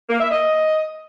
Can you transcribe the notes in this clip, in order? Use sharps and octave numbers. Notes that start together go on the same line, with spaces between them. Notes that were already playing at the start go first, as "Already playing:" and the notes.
A#3
E5
D#5